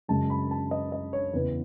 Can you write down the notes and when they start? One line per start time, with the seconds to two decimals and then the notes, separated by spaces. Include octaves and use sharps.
0.08 F#2 C#3 G#3 A5
0.30 B5
0.51 A5
0.71 D#5
0.92 D#5
1.13 C#5
1.33 E2 C#3 E3 B3 B4